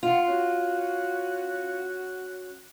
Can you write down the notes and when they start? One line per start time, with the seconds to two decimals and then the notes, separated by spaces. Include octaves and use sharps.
0.03 F4 F5 F#5 C6
0.26 C#4 F#4 F#6